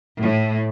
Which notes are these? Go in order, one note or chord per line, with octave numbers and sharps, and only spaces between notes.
A2